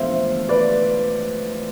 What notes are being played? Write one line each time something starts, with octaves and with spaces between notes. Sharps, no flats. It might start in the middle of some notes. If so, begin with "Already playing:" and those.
Already playing: E1 E2 D3 F3 A3 C5 E5 F5
B4 D5